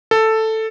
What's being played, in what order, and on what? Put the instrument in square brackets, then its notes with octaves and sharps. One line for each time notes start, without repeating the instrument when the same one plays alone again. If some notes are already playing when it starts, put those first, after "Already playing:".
[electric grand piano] A4